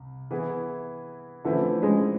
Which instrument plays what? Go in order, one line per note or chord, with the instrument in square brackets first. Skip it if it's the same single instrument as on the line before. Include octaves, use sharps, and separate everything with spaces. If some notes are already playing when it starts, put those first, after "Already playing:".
Already playing: [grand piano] C2
E3 B3 E4 G#4 B4
[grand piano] D3 F3 A3 C4 E4 [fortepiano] E3
[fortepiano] G#3